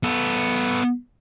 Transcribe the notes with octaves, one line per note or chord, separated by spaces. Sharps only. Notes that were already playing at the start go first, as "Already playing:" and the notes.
B3 A4